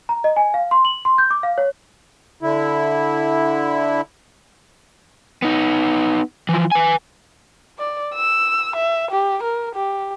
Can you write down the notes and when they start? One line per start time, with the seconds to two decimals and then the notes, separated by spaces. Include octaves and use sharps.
0.09 A#5
0.24 D#5
0.36 G#5
0.54 F5
0.71 C6
0.85 F#7
1.05 C6
1.18 G6
1.31 D6
1.43 F5
1.58 C#5
2.42 D3 E4
5.42 B3 D#4
6.49 E3 F3
6.72 B4 G#5
7.79 D5
8.14 E6
8.76 E5
9.11 G4
9.42 A#4
9.75 G4